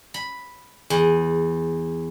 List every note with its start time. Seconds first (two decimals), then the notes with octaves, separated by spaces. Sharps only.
0.14 B5
0.90 E2